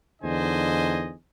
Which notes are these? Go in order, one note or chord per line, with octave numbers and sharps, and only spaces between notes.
E2 D3 D#4 C5 D#5 G#5